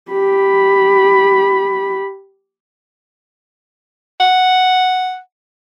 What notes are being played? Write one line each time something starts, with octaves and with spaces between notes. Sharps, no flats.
G4 B5
F#5